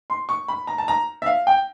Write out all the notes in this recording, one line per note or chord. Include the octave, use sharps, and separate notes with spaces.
C6
C#6
B5
A#5
A5
A#5
E5
F5
G5